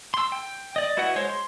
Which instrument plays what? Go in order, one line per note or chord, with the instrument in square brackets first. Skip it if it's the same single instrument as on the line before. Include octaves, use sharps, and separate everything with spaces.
[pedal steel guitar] C6 E6
G5
D5 D#5
E4 F#4 B4 D#5 F#5
G#3 C5 C#5
C6